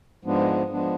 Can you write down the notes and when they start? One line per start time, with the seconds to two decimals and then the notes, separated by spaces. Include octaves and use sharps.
0.25 G#2 F3 G#3 B3 D4
0.72 F3 G#3 B3 D4